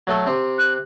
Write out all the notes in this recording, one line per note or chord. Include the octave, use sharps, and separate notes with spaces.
F#3 A3 A4
C3 C4
F#6